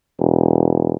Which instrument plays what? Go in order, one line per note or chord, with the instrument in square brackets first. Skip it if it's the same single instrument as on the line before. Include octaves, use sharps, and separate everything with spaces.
[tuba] E1